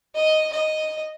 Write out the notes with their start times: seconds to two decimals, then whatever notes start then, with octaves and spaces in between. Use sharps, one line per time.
0.15 D#5
0.52 D#5